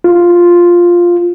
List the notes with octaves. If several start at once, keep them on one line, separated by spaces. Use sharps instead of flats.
F4